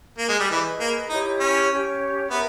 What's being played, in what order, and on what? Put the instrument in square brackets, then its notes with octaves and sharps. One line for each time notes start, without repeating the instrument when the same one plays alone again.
[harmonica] A#3
G#3
G3
[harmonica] E3 [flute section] G#4 B4 D#5
[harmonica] A#3
[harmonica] D#4 [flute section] E4 G4 C#5
[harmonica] C#4
[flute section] C#4 G4 C#5
[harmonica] B3 [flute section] A#4 E5 A#5